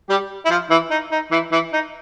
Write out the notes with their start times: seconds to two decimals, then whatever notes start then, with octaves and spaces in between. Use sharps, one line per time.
0.10 G3 G4
0.45 E4
0.50 F3 F4
0.70 E3 E4
0.91 D#4
1.11 D#4
1.31 E3 E4
1.52 E3 E4
1.73 D#4